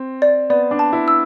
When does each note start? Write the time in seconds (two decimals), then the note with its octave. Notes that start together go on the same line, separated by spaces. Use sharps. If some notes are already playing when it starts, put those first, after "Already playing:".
Already playing: C4
0.22 D5
0.50 B3 D5
0.71 D4
0.79 A5
0.93 E4
1.08 E6